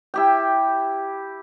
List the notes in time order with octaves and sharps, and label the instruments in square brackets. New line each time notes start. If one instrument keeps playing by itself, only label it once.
[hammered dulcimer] E4 G4 G5